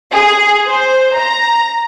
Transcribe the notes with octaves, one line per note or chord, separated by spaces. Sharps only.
G#4
C5
A#5